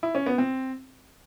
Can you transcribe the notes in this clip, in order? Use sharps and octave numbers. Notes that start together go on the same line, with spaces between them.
E4
C#4
B3
C4